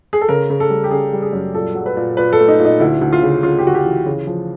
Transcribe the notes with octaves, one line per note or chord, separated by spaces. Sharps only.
G#4
A4
C#3 A#4
C#3
A4
G3
G4
C#3 G#4
G3
G#4
F#2
A#2 A4
F#3
B4
A#2
A#2 B4
A4
A3
D#4
A#2
D#4
D2 E4
D2
F4
C#3
C#3 F4
G4
D2 F#4
G4
E3
C#3
F3